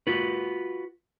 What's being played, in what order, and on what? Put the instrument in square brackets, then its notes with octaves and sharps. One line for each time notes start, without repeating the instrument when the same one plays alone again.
[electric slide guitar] F4 F#4 B4